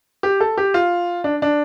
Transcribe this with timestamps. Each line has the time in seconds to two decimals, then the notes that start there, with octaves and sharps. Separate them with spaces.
0.23 G4
0.40 A4
0.58 G4
0.74 F4
1.24 D4
1.42 D4